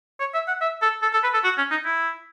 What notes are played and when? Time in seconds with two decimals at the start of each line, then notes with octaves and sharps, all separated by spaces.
0.20 C#5
0.34 E5
0.48 F#5
0.61 E5
0.82 A4
1.02 A4
1.13 A4
1.24 B4
1.34 A4
1.44 F#4
1.58 C#4
1.71 D#4
1.85 E4